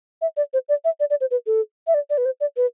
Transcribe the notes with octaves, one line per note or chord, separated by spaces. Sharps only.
E5
D5
C5
D5
E5
D5
D5
C5
B4
A4
E5
D5
D5
B4
C5
D5
B4